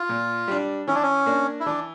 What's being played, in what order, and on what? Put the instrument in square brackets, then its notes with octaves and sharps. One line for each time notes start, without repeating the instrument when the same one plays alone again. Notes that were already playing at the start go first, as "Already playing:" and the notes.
Already playing: [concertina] F4
[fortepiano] A#2
G3 D4
[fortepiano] E3 [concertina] C#4
[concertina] D4
C#4
[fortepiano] A#3 D4
[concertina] E4
[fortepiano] E3 [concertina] D4